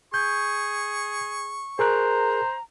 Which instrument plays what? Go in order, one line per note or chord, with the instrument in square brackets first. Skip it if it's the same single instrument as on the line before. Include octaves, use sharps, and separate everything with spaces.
[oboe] G#4 [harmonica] C#6 [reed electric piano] G6
[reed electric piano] G#4 A#4 F#6 [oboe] C5 [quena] A#5